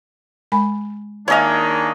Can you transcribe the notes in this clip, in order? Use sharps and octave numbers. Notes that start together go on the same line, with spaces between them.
G#3 G#5 B5
D#3 A#3 D4 E4 G#4 C#5 D#5 F5